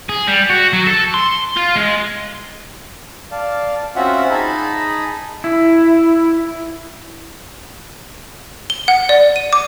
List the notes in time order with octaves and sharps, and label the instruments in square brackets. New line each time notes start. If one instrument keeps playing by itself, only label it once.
[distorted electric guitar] G#4
G3
F#4
F#3
A4
C6
F4
G#3
[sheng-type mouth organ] D5 F5 A5
C4 C#4 F4 F#4 E5 F#5
D#4 G#4 D#5 A5 B5
[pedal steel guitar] E4
[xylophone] G7
F#5
D5
D#7
D6